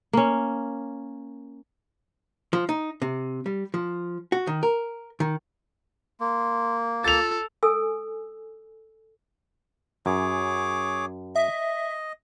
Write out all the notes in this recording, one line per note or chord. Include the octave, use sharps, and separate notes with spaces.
A#3 C#4
F3
D#4
C3
G3
F3
F#4
D#3
A#4
D#3
A#3 C6
F4 A4 A6 F7
A4 G#5 E6
F#2 G#4 C#5 D6
D#5 E5